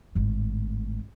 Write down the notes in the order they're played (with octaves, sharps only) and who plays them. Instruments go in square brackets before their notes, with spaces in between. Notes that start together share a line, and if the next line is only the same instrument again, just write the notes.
[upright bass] G#1 A2